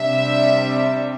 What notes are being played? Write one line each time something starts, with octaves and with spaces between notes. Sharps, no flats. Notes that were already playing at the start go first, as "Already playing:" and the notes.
Already playing: C3 G3 D4 E5